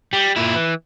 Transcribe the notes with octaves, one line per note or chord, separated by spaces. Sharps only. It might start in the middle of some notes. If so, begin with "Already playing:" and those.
G3
A#2 E4
E3